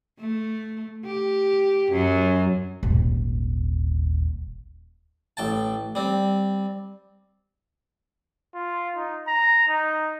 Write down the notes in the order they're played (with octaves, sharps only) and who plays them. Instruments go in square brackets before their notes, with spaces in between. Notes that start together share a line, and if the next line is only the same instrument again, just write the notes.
[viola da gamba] A3
G4
F#2
[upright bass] D#1 G#1
[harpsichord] A1 G5 A5
G3 C4
[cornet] F4
D#4
A#5
D#4